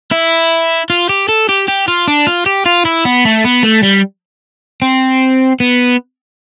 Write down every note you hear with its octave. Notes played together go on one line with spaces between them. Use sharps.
E4
F4
G4
A4
G4
G4
F4
D4
F4
G4
F4
E4
B3
A3
B3
A3
G3
C4
B3